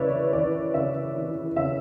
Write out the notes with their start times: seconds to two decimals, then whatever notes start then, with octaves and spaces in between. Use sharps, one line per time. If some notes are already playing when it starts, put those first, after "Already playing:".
Already playing: C#3 E3 B4 C#5 D5 E5
0.33 E3 D5
0.74 C#3 E5
1.15 E3
1.56 C#3 E5